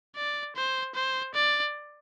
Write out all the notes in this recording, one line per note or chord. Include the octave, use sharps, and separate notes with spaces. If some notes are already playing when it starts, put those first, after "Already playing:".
D5
C5
C5
D5